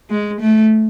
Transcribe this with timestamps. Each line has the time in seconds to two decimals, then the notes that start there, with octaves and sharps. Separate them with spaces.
0.10 G#3
0.41 A3